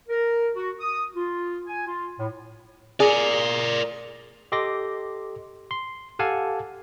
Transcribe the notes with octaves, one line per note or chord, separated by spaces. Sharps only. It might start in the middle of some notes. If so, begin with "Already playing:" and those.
A#4
F#4
D#6
F4
G#5
F4
A2
G#4 A#4 D5
G4 A4 D#5 C6 D6 A#6
C6
G4 A4 F5 F#5 G#5 A5